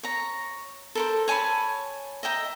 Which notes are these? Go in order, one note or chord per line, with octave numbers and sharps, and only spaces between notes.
C#5 A#5
A4 A#4 C5
C#5 G#5 A5 B5
D#5 E5 G5 A#5